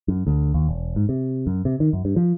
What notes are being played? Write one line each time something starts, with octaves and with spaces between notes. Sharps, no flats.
F#2
D2
D#2
E1
G#2
C3
F#2
C3
D#3
F#2
G2
F3